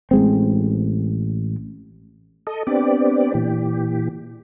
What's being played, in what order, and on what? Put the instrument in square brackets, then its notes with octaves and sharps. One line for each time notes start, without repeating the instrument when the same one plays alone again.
[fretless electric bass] A1 G#3 C4
[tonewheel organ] A4 D#5
B3 C4 D4 G4 D5
A#2 E3 G4